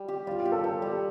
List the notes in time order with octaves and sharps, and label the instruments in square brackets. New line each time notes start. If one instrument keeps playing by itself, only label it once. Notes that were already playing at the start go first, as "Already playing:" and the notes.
Already playing: [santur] G3
G4
[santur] G3 [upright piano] F4
[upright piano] F4
[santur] G4
[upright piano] A4
[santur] G4 [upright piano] A4
[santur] G3